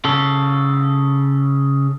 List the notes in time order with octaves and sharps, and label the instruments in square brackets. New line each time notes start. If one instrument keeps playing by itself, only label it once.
[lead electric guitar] C#3 A4